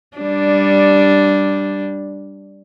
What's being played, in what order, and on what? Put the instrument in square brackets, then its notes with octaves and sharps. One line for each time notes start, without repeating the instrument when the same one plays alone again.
[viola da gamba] G3 D4